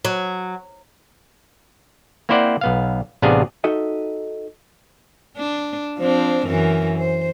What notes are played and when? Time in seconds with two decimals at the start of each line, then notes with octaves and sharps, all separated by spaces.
0.05 F#3
2.29 A#3 C4 E4 C5 D5 F#5
2.61 B1 B3 F5
3.22 A1 C3 B3 D4 G#4 F5
3.64 D#4 F#4 A4 D#5 E5
5.37 D4
5.98 F3 C4 D4
6.47 F#2 E3 A#4
6.97 C5